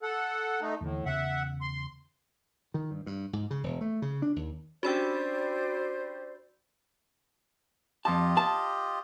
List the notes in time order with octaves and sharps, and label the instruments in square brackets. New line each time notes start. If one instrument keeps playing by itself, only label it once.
[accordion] A4 F#5
A3 D#4
[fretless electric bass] D#2 D3 E3 [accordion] A2
[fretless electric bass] E2 C#3 [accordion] E5 F#5
[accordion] C6
[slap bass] D#3
G2
G2
G#2
C#3
E1
A3
C#3
D4
D#2
[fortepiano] C#4 D4 G4 [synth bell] F#4 B5 E6 [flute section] C5 D5
[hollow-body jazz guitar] F2 A5 [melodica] F4 G4 D#5
[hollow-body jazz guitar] A5